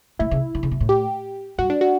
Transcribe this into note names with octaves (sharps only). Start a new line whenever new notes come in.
A2 E4
C#3
D3
C#3
B2
A2
G4
G2 F#4
D4
F#4